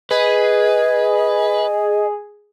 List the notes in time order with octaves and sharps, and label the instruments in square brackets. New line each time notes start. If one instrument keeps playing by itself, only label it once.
[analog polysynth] G#4 [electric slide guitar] B4 [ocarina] D#5